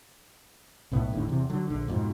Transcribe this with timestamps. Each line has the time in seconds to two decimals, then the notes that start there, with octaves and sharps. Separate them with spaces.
0.91 B1 A2 B3
1.13 G1 D#2 A2 D3
1.28 E2 C3
1.50 D3 F#3
1.68 A#1 D3
1.88 F2 G#2 B2